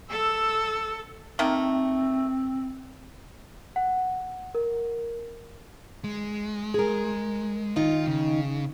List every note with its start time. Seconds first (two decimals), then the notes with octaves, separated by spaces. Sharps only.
0.10 A4 E6
1.39 D#3 A3 A#3 C4
3.76 F#5
4.55 A#4
6.04 G#3
6.74 G#4 A#4
7.76 D#3 D#4 F4
8.07 C#3